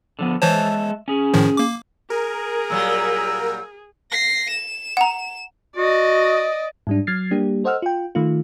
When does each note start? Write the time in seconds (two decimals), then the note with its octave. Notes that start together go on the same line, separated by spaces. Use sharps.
0.19 D3 F3 B3
0.42 E3 G#3 C5 C#5 E5 A5
1.08 C#4 G#4
1.34 A2 D#3 F3
1.57 A#3 D6
2.10 G#4 A#4
2.70 A#2 F#3 G3 E6
4.11 A#6 C7
4.50 E7
4.97 F#5 A#5
5.76 F#4 D5 D#5
6.87 G#2 G3 D4
7.07 F#3 F6 G#6 A6 C7
7.31 G3 A#3 D4 G4
7.64 A4 C5 D#5 F#5 E6 F6
7.82 F4 G5
8.15 D#3 A3 F4